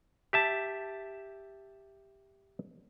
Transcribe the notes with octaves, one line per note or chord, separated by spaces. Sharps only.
G4 E5 A5